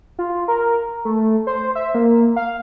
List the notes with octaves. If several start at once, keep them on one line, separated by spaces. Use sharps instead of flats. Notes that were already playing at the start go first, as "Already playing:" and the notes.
F4
A#4
A3
C5
E5
A#3
F5